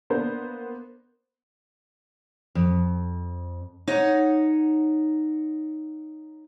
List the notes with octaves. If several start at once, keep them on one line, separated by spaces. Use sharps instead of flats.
A#3 B3 D4 C5
F2
D#4 C#5 F#5